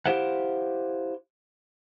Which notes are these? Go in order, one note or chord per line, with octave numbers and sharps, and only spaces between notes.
E4 G4 C5 F5 F#5